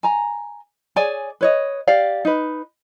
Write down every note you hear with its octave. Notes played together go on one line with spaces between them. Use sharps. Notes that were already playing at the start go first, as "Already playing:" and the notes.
G#5 A#5
G#4 C#5 D5 G#5
B4 C#5 D#5
G4 D5 F5
D#4 B4